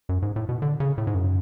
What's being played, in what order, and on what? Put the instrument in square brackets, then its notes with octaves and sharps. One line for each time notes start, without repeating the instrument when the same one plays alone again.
[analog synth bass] F#2
G#2
A2
B2
D3
C#3
A2
G#2
F#2